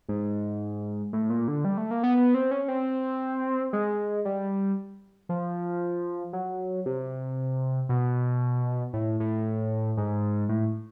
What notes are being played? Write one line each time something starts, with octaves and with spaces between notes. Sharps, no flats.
G#2
A2
A#2
D3
G3
A3
A#3
B3
B3
C4
C#4
C4
G#3
G3
F3
F#3
C3
B2
A2
A2
G#2
A2